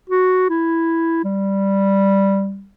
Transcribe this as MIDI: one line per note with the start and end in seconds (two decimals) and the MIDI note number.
0.10 0.47 66
0.50 1.21 64
1.25 2.70 55